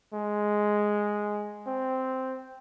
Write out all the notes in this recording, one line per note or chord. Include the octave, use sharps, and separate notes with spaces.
G#3
C4